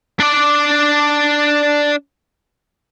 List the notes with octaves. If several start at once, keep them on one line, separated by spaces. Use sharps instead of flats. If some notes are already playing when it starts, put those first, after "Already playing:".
D4 D5